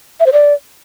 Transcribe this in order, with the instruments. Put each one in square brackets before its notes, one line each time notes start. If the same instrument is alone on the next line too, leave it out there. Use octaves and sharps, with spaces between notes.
[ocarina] E5
C5
D5